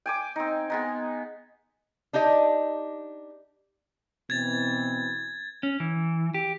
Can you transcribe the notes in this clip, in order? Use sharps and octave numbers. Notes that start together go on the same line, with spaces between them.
G5 G#5 D6
C4 D#4
G#3 B3 D#4
D4 D#4 G4 D#5
B2 E3 C4 G#6 A6
C#4
E3
G4